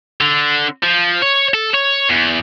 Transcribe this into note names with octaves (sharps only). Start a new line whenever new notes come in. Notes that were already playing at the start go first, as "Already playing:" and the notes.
D3
F3
C#5
A4
C#5
E2